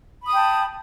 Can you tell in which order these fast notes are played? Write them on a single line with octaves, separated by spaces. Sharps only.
B5 D#6 G5 A5